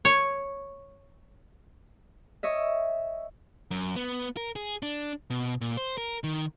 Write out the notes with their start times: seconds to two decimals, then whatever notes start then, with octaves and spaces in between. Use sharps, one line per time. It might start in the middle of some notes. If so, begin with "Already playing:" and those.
0.05 C#5
2.43 C#5 D#5 E5
3.71 F#2
3.96 B3
4.37 A#4
4.56 G#4
4.83 D4
5.30 B2
5.61 A#2
5.77 C5
5.98 A#4
6.24 D#3